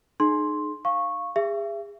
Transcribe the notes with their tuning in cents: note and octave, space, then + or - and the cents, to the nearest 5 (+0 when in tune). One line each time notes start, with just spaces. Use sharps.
D#4 -35 G#4 +35 C6 +5
F5 +0 C#6 -10
G#4 -30 E5 +35